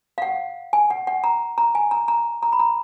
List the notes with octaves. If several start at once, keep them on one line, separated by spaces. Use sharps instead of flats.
F5
F#5
G#5
F#5
F#5
A#5
A#5
G#5
A#5
A#5
A#5
B5
A#5